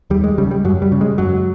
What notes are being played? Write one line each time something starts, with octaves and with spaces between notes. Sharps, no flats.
D#2 G3
G#3
C#3 G3
G3
F#2 F#3
G3
C#3
G#3
F#2 F#3